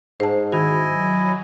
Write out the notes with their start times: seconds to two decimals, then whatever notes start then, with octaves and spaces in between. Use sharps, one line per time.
0.20 G#2 C5 A5
0.52 D#3 E4 F#4 D#5 G#5
0.88 F#3